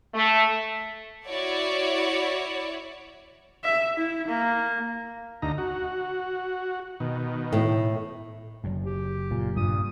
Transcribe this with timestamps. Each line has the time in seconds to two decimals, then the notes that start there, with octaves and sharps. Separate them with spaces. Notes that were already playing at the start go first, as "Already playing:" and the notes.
0.14 A3
1.27 E4 F#4 C#5 D5
3.64 E5
3.97 E4
4.28 A#3
5.42 D2 D#4 A#5
5.58 F#4
7.00 B2 D#3
7.52 A2
8.64 F#1 F#2
8.85 G4
9.31 A#2
9.57 G2 A#2 D#6